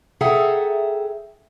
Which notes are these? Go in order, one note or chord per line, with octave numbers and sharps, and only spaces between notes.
G#4 A4 E5 F#5 G5 A#5